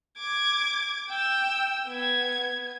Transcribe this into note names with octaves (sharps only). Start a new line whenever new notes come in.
D6 G#6
G5 E6
B3 G#6